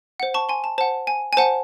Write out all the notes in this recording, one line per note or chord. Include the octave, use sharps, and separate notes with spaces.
C5 F#5
A5 C#6
G#5 C6
A5
C5 F#5 A5
G#5
G#5
C5 F#5 A5